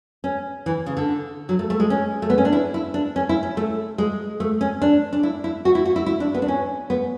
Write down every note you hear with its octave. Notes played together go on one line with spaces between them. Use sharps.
C#4
E3
C#3
D3
F#3
A3
A3
G#3
C#4
A3
B3
C#4
D4
E4
E4
D4
C#4
E4
C#4
A3
G#3
A3
C#4
D4
D4
E4
E4
F#4
E4
F#4
E4
E4
D4
B3
D4
C#4
B3